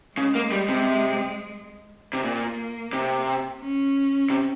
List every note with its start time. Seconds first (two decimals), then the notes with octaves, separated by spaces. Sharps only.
0.17 C#3 G#3
0.35 A#3
0.52 G3
0.69 C3
2.13 C3
2.23 A#2 A#3
2.93 C3
3.61 C#4
4.30 C3